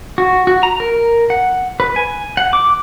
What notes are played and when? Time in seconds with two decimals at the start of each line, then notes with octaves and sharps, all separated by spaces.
0.18 F#4
0.47 F#4
0.63 A#5
0.80 A#4
1.30 F#5
1.80 B4
1.96 G#5
2.37 F#5
2.53 D6